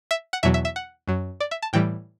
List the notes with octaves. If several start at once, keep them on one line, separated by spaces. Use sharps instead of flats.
E5
F#5
E2 B2 F#3 E5
E5
E5
F#5
F#2 F#3
D5
E5
A5
A2 E3 G3 G5